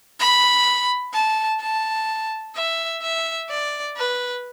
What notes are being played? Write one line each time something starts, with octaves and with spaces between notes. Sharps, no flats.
B5
A5
A5
E5
E5
D5
B4